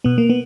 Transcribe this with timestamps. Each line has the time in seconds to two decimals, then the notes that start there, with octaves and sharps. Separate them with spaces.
0.04 B2 B3
0.18 A#3
0.29 B3